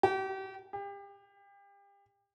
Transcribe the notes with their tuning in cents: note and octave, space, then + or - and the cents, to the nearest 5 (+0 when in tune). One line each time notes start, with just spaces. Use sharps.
G4 -35
G4 +35